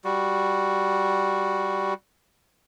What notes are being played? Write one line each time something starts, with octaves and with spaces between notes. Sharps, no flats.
G3 F#4